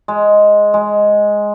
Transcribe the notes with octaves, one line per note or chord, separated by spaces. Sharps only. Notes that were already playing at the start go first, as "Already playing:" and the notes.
G#3
G#3